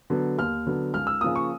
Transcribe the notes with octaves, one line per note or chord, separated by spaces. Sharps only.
D3 F#3 B3
D#2 F6
D3 F#3 B3
C#2 F6
E6
C#3 F3 A#3 D#6
C#6